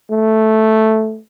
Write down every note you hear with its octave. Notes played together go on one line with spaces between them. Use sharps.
A3